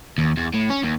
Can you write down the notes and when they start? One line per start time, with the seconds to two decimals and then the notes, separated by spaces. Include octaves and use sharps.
0.18 D#2
0.37 E2
0.54 A2
0.70 C#4
0.83 D#2